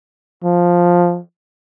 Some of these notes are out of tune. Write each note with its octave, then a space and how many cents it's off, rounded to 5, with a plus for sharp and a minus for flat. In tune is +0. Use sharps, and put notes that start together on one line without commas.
F3 +5